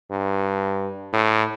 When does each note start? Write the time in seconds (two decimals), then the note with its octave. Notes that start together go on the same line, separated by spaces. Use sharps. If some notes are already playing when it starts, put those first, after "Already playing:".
0.11 G2
1.13 A2